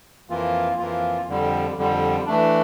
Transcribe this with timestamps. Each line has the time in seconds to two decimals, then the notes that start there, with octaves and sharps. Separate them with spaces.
0.30 F2 E3 A#3 F4
0.78 F2 E3 A#3 F4
1.28 F2 D3 G3
1.77 F2 D3 G3
2.26 E3 A3 D4